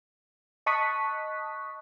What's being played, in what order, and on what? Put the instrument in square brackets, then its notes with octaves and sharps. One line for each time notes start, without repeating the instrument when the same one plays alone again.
[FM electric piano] D#5 A5 C#6 D#6 F#6 B6